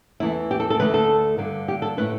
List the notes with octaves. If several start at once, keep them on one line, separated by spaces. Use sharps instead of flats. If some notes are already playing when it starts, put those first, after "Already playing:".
E2 E3 A3 E4
G4
A4
A4
D2 D3 A3 B4
A4
G2 D3 G3
G4
A4
A2 A3 B4